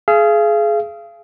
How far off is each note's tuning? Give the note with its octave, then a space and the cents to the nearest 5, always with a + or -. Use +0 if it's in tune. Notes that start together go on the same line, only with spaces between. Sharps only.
G#4 +25 F5 -35